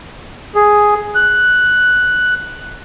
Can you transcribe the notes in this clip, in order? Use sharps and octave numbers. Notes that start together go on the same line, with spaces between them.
G#4
F#6